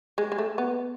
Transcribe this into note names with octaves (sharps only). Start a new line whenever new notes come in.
G#3
G#3
A3
B3